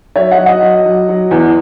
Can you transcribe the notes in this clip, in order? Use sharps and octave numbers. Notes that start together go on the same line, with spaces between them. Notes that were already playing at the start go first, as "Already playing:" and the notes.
F#3 C#5 E5
D#5 F#5
F#3
D#5 F#5
F#3
F#3
F#3
E2